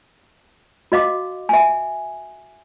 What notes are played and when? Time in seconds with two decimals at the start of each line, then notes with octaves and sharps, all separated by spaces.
0.92 F#4 D#5 F5 D6
1.49 E5 G#5